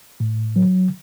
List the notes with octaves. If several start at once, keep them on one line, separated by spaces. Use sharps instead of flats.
A2
F#3